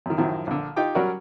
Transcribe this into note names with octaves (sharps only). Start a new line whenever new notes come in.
F#2 D#3
F#2 A2 D#3 F3 F#3
A#1 D3
D#4 F4 G4 G5 D6
F#3 G3 C#4 F#4 A#4 D5